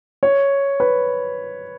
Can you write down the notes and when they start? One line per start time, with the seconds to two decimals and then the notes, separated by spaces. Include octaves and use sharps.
0.23 C#5
0.80 B4